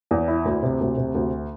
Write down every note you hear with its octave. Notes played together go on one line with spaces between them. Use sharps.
E2
E4
D2
C3
D2
C3
D2